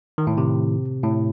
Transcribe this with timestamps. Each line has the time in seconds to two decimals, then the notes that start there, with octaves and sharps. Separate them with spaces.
0.18 D#3
0.27 A2
0.38 C3
1.04 A2